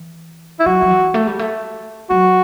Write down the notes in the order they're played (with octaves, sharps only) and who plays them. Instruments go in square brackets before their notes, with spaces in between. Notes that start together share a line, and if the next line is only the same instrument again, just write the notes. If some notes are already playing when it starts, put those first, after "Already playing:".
Already playing: [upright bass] E3
[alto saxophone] E4
[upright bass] F#3 [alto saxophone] F#4
[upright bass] F#3
E3
A3
G3
A3
[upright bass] F#3 [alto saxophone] F#4